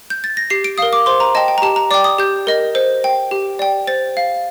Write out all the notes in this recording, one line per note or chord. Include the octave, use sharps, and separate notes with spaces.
G6
A6
A#6
G4 C7
D7
A#4 F5 D#6
D6
C5 C6
A#5
D#5 G5 A5
G5
A#5
G4 A5
A#5
D5 G5 D6
D#6
G4 G6
A#4 D#5
C5
G5
G4
D5 G5
C5 A6
F5